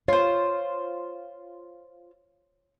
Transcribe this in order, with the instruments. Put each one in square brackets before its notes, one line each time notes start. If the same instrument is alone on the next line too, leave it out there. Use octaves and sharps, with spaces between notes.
[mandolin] F4 C5 [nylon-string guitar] C#5